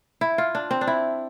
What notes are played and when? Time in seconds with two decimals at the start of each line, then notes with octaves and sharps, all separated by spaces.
0.21 E4
0.38 F4
0.55 D4
0.71 C4
0.81 D4
0.87 E4